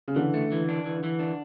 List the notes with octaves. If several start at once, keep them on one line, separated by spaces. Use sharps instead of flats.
C#3
D3 E3
A3
E3
D4
E3
E3
D4